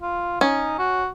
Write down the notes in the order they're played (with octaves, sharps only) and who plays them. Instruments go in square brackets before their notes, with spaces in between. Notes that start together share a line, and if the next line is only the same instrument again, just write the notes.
[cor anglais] F4
[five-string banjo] C#4 [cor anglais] D#4
[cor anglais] F#4